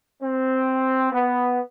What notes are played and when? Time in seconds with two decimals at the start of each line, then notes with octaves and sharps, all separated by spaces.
0.21 C4
1.12 B3